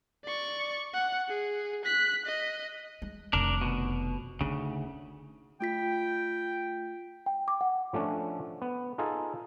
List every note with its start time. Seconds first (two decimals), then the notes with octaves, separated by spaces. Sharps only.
0.25 D5 C#6
0.94 F#5
1.29 G#4
1.85 F#6 B6
2.26 D#5
3.02 G#3
3.33 F1 D#3 D4 A#4
3.62 B2
4.41 D2 C#3 D#4
5.60 A3 F4 G5 B6
7.26 G5
7.48 D6
7.61 F#5
7.93 F3 A3 C#4 D4
8.62 B3
8.98 D#4 F4 G#4 A4